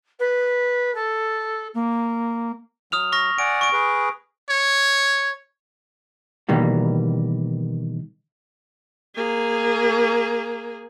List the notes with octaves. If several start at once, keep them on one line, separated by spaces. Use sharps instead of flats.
B4
A4
A#3
F#3 D#6 F6 F7
C#6 F6 A#6
D5 F#5 G#5 D7
C#6 D7
G#4 B4
C#5
B2 D#3 E3 G3 A#3
A#3 G#4